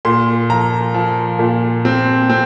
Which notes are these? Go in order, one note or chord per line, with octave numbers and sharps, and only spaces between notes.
A#2 C6
F3 A#5
F3
A#2
C4
C4